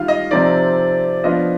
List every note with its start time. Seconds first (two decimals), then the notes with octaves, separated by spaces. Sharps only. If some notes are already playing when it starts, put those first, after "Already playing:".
Already playing: D#3 G3 F4 F5
0.08 D#5
0.31 C3 F3 C4 D#4 D5
1.24 F3 B3 D4 F4 D#5